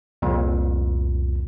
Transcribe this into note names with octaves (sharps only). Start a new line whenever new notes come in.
C2 F2 A#2